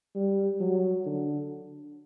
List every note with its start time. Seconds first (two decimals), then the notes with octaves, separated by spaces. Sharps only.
0.15 G3
0.60 F#3
1.06 D3